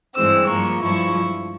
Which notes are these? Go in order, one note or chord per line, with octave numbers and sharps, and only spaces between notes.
G2 E3 G#3 C4 E6
G2 F3 A#3 C#6
G2 F3 G#3 E4 C#6